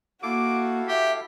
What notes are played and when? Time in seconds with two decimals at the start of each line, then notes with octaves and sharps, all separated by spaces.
0.23 A#3 E4 F#4 A4 F5 D6
0.88 G4 E5